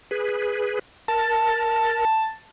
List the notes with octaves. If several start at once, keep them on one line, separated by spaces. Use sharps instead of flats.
G#4 B4
A#4 A5